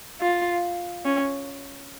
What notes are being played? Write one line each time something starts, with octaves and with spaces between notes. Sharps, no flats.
F4
C#4